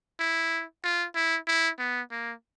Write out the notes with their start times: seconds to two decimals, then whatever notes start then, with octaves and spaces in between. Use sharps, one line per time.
0.20 E4
0.84 F4
1.15 E4
1.47 E4
1.79 B3
2.11 A#3